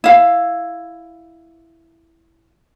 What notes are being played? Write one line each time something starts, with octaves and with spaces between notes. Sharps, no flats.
E4 F5